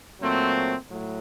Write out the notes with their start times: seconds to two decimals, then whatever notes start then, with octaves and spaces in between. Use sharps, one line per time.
0.21 A#2 F#3 A3 C4
0.89 A2 F#3